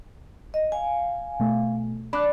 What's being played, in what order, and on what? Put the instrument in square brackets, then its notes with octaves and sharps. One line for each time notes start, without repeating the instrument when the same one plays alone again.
[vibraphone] D#5
F5 G#5
[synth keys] B2 A3
[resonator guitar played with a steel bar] D4 [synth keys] B5 D6 F#6